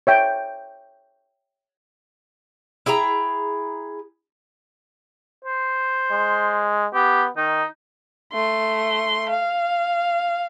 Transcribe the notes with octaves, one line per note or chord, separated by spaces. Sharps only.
C#5 E5 G5
E4 G#4 G5 A#5
C5
G#3
B3 G4
D#3 D#4
A3 C6
F5